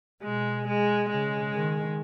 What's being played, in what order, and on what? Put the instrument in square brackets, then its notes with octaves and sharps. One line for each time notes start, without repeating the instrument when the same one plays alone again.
[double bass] B2 [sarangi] G#3
[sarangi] G#3
[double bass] C#3 [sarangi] G#3
[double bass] D#3